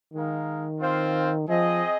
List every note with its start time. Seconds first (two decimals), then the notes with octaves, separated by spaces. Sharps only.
0.14 D#3 G#3 D#4 A#4 F5
0.80 C4 F4 C5 F5
1.48 F3 C4 G#4 D#5